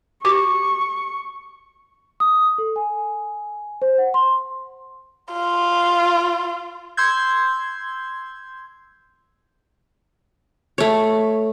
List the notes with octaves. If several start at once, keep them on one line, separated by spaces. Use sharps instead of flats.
F#4 G4 C#6 D6
D#6
A4
G#5
C5
F#5
C6
F4
C6 E6 G6 G#6
A3 C#5